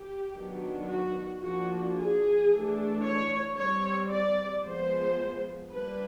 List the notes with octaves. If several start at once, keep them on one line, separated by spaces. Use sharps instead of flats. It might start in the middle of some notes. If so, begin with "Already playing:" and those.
Already playing: G4
D#3 F#3 B3 D4
F#4
F3 A#3 D4 F#4
G#4
E3 A3 D4
C#5
G3 C4 C#5
D5
F3 G#3 B3 C5
G3 A#3 D4 B4